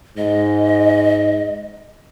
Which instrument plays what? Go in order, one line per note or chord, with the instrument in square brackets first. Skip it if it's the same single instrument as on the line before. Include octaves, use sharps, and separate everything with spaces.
[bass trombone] G#2 [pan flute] D#5